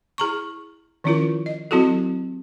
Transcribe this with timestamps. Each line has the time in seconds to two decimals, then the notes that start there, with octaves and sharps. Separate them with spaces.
0.18 E4 G#4 A#5 C#6
1.04 D#3 F3 C#4 E4 F4 A#4
1.46 D#5
1.71 F#3 C4 E4 F#4 G4 A4